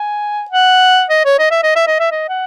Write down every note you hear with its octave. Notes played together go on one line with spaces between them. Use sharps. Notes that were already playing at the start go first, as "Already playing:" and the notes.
Already playing: G#5
F#5
D#5
C#5
D#5
E5
D#5
E5
D#5
E5
D#5
F#5